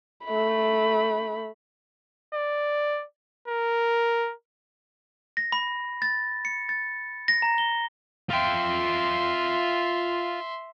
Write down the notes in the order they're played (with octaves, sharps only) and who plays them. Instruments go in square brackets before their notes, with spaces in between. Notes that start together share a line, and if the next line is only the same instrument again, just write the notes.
[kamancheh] A3 B5
[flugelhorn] D5
A#4
[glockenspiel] A#6
B5
A6
C#7
A6
A#6
A#5
G7
[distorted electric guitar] F4 G5 [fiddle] E5 C6